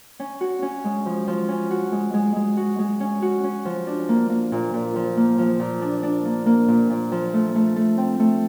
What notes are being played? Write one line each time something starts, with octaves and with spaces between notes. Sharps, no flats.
C#4
F#4
C#4
G#3
F3
F3
C#4
F#4
G#3
G#3
G#3
F#4
G#3
C#4
F#4
C#4
F3
D4
A#3
A#3
A#2
A#2
F3
A#3
F3
A#2
D4
D4
A#3
A#3
A#2
A#2
F3
A3
A3
A3
C4
A3